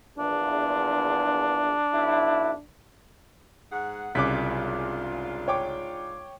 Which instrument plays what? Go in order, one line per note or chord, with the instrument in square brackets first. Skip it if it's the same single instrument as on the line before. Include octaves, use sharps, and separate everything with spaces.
[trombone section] A#1 E2 [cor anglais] D4
[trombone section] B1 E4
[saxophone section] G#2 G#4 F#5
[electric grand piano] C2 C#3 [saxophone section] G#2 D4 F4 [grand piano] D6 F#6 B6
[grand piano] C#5 G5 D6